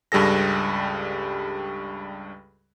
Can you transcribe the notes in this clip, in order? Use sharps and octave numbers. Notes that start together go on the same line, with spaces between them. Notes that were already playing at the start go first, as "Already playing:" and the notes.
C#2 G2 G3 G#4 A4 A#6